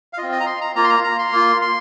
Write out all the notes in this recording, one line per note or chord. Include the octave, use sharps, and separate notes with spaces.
F5
C4 F4 D#5
D#5
A#5
C6
A#5
A#3 F4 A#5
C6
A#5
A#5
C6
A#3 F4
C6